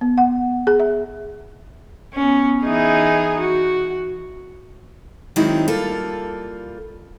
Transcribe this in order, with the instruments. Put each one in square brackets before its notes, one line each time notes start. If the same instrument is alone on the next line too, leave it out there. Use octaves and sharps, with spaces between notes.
[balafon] B3
F#5
G#4
E5
[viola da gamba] B3 C#4
E3 D#4 G#4
F#4
[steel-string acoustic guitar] D#3 F#3 G#3 C4 D#4 E4
G3 A#3 F4 A4